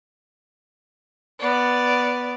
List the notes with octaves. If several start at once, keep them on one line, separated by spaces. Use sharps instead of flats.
B3 D5